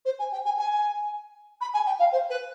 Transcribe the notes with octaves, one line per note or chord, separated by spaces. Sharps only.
C5
G#5
G5
G#5
G#5
B5
G#5
G5
F5
C5
B4